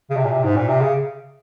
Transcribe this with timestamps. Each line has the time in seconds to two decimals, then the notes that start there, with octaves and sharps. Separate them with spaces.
0.10 C#3
0.16 C3
0.24 A#2
0.31 C3
0.43 G#2
0.56 A#2
0.68 C3
0.81 C#3